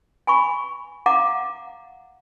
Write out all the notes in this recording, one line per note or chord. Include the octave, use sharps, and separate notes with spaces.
G#5 B5 C#6
F5 F#5 A#5 D6